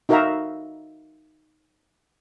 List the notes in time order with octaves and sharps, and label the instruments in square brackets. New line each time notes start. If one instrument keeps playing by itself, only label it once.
[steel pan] D#4 F#4 A#4 E5 F5 A#5